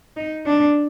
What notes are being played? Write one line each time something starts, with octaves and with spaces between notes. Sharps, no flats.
D#4
D4